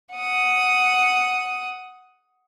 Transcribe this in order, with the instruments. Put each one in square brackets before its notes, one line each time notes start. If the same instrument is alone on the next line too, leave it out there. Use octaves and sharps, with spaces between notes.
[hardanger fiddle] F#5 D#6